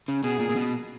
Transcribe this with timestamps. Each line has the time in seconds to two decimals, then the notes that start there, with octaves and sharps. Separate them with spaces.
0.08 C#3
0.24 B2 G#4
0.39 A#2
0.50 A#2
0.56 B2